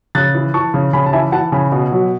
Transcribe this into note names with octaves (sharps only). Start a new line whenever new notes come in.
C#3 F#6 A6
E3
E3 A5 C#6
C#3
C#3 G#5 B5
A5
E3 E5 G#5
E3 F#5 A5
C#3 G#5 B5
B2
F#3